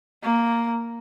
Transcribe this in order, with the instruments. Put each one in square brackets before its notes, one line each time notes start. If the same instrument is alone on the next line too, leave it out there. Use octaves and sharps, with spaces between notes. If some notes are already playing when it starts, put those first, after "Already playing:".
[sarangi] A#3